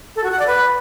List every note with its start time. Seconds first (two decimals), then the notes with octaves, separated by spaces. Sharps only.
0.16 A4
0.24 F#4
0.32 F#5
0.39 D5
0.47 B4